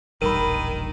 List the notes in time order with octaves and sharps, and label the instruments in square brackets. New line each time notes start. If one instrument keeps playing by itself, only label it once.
[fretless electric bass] E1 A#1 G3 [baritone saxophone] D#3 [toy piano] A#4 B5 [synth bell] D#7